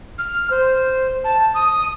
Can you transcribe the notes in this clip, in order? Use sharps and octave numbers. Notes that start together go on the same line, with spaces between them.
F6
C5
A5
D#6